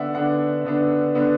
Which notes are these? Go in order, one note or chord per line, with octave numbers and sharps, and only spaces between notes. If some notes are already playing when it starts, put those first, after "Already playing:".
Already playing: D3 B3 D4 D5 E5 F#5
D3 B3 D4 F#5
D3 B3 D4
D3 B3 D4